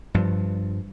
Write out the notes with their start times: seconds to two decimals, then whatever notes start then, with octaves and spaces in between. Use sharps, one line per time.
0.14 G2 F3